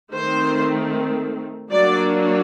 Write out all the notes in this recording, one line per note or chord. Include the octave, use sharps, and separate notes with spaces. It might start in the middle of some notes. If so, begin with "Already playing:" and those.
D#3 A3 C4 C5
F#3 A#3 D4 D5